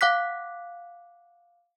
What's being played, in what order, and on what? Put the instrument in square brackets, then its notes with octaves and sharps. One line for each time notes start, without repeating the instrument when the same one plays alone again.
[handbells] F5 F#5 D6 F#6 B6